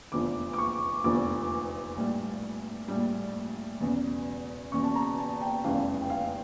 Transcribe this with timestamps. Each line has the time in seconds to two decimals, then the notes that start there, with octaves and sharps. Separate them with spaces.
0.12 F1 E2 D3 F3 D6
0.53 D6
0.58 C#6
1.04 F1 E2 D3 F3 D6
1.96 A#1 A2 G3
2.88 A#1 A2 G3
3.80 E1 E2 C#3
4.72 E1 E2 C#3 C#6
4.84 A5
4.96 A#5
5.18 A5
5.41 G5
5.64 F1 E2 C#3 E3 G3 F5
6.01 G5
6.10 F5